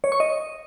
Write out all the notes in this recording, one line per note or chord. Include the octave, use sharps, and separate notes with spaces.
C#5
C#6
D#5